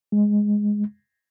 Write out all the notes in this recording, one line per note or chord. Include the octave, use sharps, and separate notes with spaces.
G#3